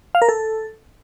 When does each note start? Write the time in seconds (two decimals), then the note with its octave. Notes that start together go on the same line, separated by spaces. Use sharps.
0.15 F5
0.22 A#4
0.29 A4